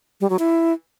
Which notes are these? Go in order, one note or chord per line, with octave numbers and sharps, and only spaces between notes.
G3
F#3
E4